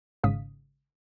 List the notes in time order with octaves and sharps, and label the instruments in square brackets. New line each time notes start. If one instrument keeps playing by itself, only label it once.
[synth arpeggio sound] G#1 G#2 C#3 F5 D#6 B6